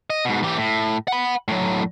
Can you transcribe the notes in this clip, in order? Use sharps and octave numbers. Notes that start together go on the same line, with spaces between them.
D#5
G#2 B2
E3 G4
A2
F#5 B5
A2 F#3